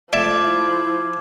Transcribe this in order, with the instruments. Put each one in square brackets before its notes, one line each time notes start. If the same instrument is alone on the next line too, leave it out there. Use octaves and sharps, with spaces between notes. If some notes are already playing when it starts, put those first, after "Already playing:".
[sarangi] F3 [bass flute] A3 [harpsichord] D5 E5 A5 [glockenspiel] D6 G#6
[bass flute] E4